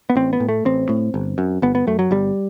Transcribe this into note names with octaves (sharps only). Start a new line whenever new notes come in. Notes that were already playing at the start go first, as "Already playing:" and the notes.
B3
A1 C4
B3
A2
A3
A1 C4
A2
G1
F#2
G1 B3
B3
F#2 A3
F#3
G1 G3